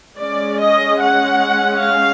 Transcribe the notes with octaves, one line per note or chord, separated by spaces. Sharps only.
G#3 C#4 D5
D#5
F#5
F5